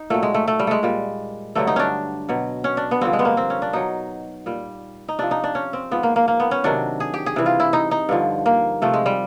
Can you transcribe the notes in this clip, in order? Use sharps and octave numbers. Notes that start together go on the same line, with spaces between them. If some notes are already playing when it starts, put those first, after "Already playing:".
Already playing: D#4
A#2 F#3 A3
G#3
A3
A3
G3
G#3 A3
A#2 G3
G2 D3 F#3 A3
D#4
C#4 D4
B2 F#3
C#4
D4
B3
G2 D3 F3 C4
G#3
B3
A#3
C4
C#4
D4
B2 F#3 D#4
A#2 G3
D#4
C3 F3 D4
D#4
D4
C#4
C4
G#2 F3 B3
A#3
A#3
A#3
B3
C#4
C3 D#3 F#3 D4
G#4
G4
G#4
C3 E3 G3
F4
E4
D#4
D#4
G2 D3 F3
A#3
C3 F3 A3
G#3
G3